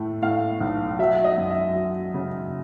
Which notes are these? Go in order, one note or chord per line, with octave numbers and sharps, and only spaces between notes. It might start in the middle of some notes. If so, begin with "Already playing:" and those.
Already playing: A2 A3
A2 F5
B1
F#3 E5
D#5
F#2
E5
F#3
C#3